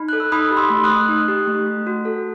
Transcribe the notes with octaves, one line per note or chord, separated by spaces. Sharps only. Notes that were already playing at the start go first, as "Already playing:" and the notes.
Already playing: D#4 B5
A4 F#6
E6
D#4 B5 D#6
G4
C6 E6
A3
D#6 F#6
A3
D#4
G4
A3
A3
F#4
A4